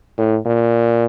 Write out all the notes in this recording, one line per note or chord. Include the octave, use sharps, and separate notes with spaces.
A2
A#2